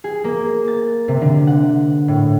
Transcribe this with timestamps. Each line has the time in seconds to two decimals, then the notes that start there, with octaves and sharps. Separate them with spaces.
0.04 G#4
0.24 A#3
0.68 A6
1.08 C3
1.21 D3
1.47 F#5
2.08 A2